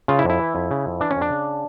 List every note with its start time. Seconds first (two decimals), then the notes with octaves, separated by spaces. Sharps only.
0.08 C#3 F4
0.19 E4
0.24 F2
0.29 E4
0.39 E3
0.55 F2
0.71 C#3
0.86 F2
1.00 E3 D4
1.10 C#4
1.15 F2
1.21 D4
1.31 C#3